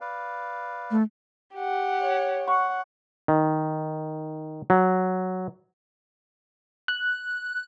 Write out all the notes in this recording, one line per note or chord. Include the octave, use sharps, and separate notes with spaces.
B4 D5 F5
A3
G4 F#5
C#5
F#5 C#6
D#3
F#3
F#6